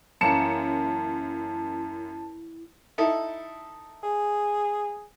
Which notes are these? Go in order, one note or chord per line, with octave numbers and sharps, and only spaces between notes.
F#2 E3 A#3 C#4 E4 A5 C#7 E7
D#4 E4 A4
G#4